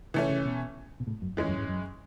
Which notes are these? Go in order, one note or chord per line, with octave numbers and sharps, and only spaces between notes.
C#3 E3 A3 C#4
C#3
B2
B2
A2
F#2
E2 E3 G#3 C#4
F#2
G#2
F#2